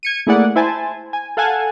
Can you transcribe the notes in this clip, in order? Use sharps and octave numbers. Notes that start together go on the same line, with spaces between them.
G#6 C#7 D#7
A3 A#3 E4 G#4 D5 F#5
E4 C5 G#5 A5
G#5
A4 F5 F#5 G#5 A5